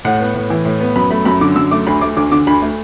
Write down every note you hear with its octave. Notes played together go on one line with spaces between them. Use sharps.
A2 F#5
B3
A2
E3
A2
B3
F#2 B5
A3 B5
F#2 B5
D3 D6
F#2 E6
A3 D6
D2 B5
A3 D6
D2 D6
D3 D6
D2 B5
A3